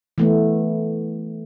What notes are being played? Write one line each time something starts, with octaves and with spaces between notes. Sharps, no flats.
E3 A3 B3